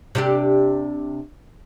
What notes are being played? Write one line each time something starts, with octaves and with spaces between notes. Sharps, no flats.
C3 D4 G4